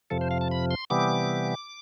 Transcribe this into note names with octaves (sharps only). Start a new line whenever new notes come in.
F2 C3 F3 A4
C5
F5
A5
B5
C6
C3 E3 G3 B3 D6